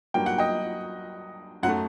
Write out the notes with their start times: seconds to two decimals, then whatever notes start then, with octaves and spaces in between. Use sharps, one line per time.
0.14 G2 F#3 A#3 G5
0.26 F#5
0.38 D#5 G5
1.63 F#2 F#3 A3 F#5